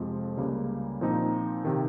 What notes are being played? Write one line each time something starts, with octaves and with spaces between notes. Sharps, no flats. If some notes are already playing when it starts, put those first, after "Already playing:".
Already playing: F2 C3 F3 G#3
C#2 C#3 G3 A#3
A#2 F3 C4 D#4
C3 D#3